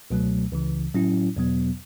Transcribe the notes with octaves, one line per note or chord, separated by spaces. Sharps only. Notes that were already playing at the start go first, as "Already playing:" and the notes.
C#2 B2 F#3 A3
C#2 C#3 E3
A2 F#3 C#4 E4
E2 B2 F#3 B3